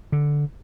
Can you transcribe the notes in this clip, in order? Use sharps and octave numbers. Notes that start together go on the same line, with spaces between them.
D3